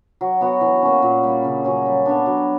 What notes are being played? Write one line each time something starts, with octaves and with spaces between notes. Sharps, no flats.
F#3
B3 F#4
E3
A#3 C#4
A#2
G3 A#3
C#3
F#3 C#4
G3
B3 D4
F#3